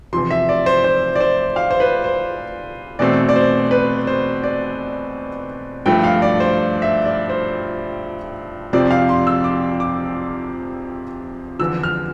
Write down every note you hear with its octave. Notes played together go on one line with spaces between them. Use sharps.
E2 C3 F3 C6
E5
D5
C5
C5
D5
C5
F5
C5
B4
C5
E2 B2 A3 C4 D5
D5
C5
B4
C5
D5
G2 F3 A3 G5
F5
D5
C5
E5
D5
C5
F2 C3 F3 C4 D5
F5
C6
E6
D6
D6
E2 D3 F3 E6
F6